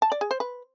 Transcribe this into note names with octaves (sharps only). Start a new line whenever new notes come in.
A5
D5
G#4
C5
B4